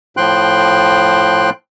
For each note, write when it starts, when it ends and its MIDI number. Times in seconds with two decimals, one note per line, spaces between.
0.17 1.50 45
0.17 1.50 53
0.17 1.50 79
0.17 1.50 84
0.17 1.50 90